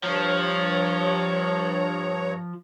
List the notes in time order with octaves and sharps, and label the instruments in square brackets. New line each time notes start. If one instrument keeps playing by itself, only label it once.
[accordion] G2 C#5 A#5 [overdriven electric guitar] F3